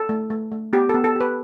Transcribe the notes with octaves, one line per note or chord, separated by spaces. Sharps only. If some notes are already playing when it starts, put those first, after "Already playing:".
Already playing: A4
A3
A3
A3
B3 G4
B3 A4
A4
G4 B4